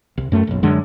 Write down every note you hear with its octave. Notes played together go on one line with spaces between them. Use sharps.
C2
F#2 A3
F#1 B1
F#2 D3 G#3